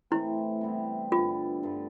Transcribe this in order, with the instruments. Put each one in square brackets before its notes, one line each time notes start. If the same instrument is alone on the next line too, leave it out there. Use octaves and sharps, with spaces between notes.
[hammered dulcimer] A2 E3 A3 C4 [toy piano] E4
[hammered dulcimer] C3 G3 B3 E4
[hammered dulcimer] G2 D3 G3 [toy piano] F4
[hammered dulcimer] G2 D3 A3